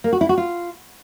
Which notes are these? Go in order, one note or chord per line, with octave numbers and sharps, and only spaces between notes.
A#3
F#4
E4
F#4
F4